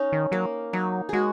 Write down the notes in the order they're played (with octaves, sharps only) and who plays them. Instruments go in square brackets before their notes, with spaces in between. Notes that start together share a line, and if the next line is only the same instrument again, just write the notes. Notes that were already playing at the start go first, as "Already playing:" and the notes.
Already playing: [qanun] C#4 D#4
[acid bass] D#3
[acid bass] F#3 [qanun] A#3
[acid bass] F#3 [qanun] D#4
[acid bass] G#3 [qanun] F#4 G#4